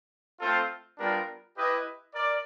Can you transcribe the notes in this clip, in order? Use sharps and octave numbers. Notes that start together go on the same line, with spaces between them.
A3 C4 F4 A4 C5
G3 B3 D4 F4 A#4
E4 G4 B4 D#5
A#4 D5